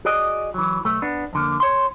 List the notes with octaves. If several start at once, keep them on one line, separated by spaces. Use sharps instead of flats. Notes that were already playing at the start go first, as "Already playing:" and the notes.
F#4 G#4 D5 D#5
E3 F#3
B1 A3
B3 D4
F2 D3 A#3
C#5 C6